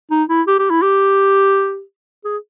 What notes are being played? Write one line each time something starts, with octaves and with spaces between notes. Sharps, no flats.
D#4
E4
G4
G4
E4
G4
G#4